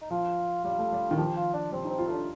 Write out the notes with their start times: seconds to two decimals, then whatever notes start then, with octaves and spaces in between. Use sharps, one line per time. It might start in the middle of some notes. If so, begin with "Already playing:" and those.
0.01 D#4
0.11 F3 F4
0.64 G3 F4
0.78 A3
0.92 G3
1.11 D#3
1.18 F3 G4
1.36 F4
1.54 D4
1.72 G3 C4
1.85 D#4
1.90 C4
1.98 F4
2.08 A3 D4